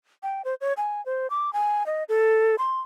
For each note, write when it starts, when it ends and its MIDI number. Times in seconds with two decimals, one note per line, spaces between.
0.23 0.42 79
0.45 0.55 72
0.61 0.73 73
0.77 1.04 80
1.06 1.27 72
1.30 1.53 86
1.53 1.86 80
1.86 2.04 75
2.09 2.56 69
2.58 2.81 84